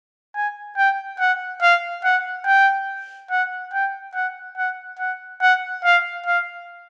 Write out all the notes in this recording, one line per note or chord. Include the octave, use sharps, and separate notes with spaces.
G#5
G5
F#5
F5
F#5
G5
F#5
G5
F#5
F#5
F#5
F#5
F5
F5